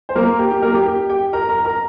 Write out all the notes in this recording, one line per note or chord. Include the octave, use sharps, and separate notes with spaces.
C5
A#3 A#4
G4
G4
A#3 A#4
G4
G4
G4 G5
A#4 A#5
A#4 A#5
A#4 A#5